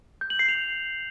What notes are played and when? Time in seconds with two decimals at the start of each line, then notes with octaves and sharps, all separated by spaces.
0.21 G6
0.30 F#7
0.39 C7
0.48 F7